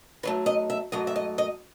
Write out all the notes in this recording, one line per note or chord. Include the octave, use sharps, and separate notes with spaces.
G#2 F#3 A3 B4
D#5
E5
G#2 F#3 A3 D#5
E5
D#5
D#5